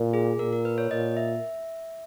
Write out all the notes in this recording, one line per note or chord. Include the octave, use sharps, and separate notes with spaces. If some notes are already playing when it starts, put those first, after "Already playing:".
Already playing: A#2
G#4
A#2 A#4
A#4
B4
C#5
A#2 D#5
E5